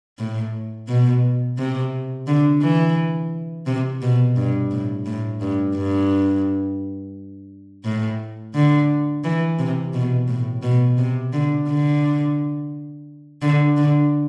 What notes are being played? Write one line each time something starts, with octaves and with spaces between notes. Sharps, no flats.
A2
B2
C3
D3
E3
C3
B2
G2
A2
A2
G2
G2
A2
D3
E3
C3
B2
A2
B2
C3
D3
D3
D3
D3